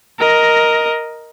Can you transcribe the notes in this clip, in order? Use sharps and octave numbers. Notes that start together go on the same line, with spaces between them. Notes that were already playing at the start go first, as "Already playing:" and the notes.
A#4 D#5